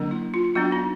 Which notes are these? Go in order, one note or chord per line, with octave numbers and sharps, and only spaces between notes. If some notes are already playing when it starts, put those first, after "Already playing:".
Already playing: D3 F#3 A#3 D4
E4
F4
F#3 B3 D4 F#4
D#4